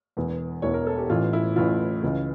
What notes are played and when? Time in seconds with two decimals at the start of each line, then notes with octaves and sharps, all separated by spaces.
0.17 E1 E2 E3
0.62 E1 E2 E3 C#5
0.74 A#4
0.87 A4
0.98 G4
1.10 A1 A2 E3 F4
1.33 E4
1.56 A1 A2 E3 F4
2.03 C#2 C#3 E3